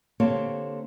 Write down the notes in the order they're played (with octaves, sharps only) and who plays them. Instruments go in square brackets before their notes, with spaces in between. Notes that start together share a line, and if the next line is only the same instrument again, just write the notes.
[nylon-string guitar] D3 A#3 C4 G4 C#5 A5